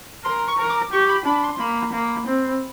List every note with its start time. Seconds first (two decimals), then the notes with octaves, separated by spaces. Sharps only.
0.25 A#4 C6
0.48 C#6
0.58 A#4
0.69 D6
0.92 G4 C#6
1.09 B5
1.25 D4 B5
1.43 C6
1.59 A#3 B5
1.93 A#3
2.27 C4